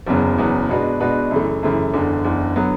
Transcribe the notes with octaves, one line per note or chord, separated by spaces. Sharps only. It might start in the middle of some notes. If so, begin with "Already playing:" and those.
F#1 E2 C#3 F#3 B3
F#1 E2 C#3 F#3 B3
B2 G#3 D4 F#4 B4
B2 G#3 D4 F#4 B4
F#2 C#3 E3 A3
F#2 C#3 E3 A3
F#1 E2 D3
F#1 E2 D3
D3 F#3 B3